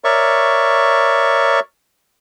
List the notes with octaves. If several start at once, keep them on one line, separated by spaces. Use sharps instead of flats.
A#4 C#5 D5 E5 C#6